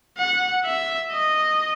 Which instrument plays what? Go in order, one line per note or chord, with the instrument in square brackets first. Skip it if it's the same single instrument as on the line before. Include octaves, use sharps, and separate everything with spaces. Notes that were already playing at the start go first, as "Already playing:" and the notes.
[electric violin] F#5
E5
D#5